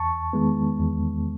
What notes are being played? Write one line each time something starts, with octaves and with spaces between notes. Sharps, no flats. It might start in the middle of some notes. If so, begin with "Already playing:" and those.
Already playing: E2 A5 C#6
D#3 G#3 B3
E2